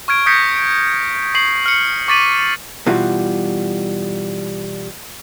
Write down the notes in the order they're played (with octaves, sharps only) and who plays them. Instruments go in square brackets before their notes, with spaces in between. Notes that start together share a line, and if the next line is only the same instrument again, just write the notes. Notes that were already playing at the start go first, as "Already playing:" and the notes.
[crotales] C#6 F6 G#6 D7
D#6 G6 G#6 A#6 B6 C#7
D7
C#6 C7 F#7
F6 C#7
C#6 D6 A6 B6 D#7 F#7
[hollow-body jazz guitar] B2 E3 G3 F4 F#4